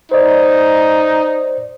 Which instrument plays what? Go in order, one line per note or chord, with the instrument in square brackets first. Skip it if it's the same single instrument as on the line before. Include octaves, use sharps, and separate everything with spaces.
[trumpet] D#4 [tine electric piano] C5 D5